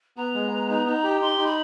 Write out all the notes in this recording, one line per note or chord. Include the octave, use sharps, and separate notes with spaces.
B3 A#5
G#3
B3
D#4
D#4
G4
D#4 C6
D#4
B5